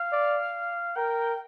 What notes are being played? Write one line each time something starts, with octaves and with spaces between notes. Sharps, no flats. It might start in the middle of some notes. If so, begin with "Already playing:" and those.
Already playing: F5
D5
A#4 G5